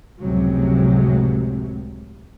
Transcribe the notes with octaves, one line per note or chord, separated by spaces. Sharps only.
F1 C#2 A2 C3 F#3 G#3